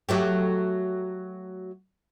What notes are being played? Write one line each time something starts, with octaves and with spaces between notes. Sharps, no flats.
F#3 A3 G4